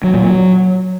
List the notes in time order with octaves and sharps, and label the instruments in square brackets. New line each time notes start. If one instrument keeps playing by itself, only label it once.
[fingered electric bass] F#3
A#2
F#3